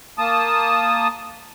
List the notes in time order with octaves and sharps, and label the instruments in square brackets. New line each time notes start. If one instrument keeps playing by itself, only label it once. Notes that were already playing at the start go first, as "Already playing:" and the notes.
[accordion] A#3 A5 D#6